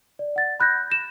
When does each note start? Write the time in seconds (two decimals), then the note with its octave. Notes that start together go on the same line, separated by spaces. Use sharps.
0.19 D5
0.36 F#5 A6
0.60 B5 F#6 G6 A#6
0.90 A#6 E7